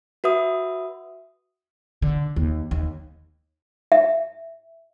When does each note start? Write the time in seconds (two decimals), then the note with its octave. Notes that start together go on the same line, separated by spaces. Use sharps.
0.24 F#4 B4 E5 D#6
2.02 D3
2.36 D#2
2.71 D#2
3.92 E5